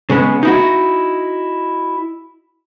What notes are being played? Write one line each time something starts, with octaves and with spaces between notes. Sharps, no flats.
C#3 G#3 B3
D#4 E4 F#4